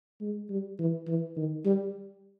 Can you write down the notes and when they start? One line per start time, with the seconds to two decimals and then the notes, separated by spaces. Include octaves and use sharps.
0.21 G#3
0.50 G3
0.79 E3
1.08 E3
1.37 D#3
1.65 G3